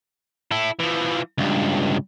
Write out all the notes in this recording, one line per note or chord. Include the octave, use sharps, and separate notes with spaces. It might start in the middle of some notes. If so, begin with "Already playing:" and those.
E4 A4
E3 F3
C#2 G2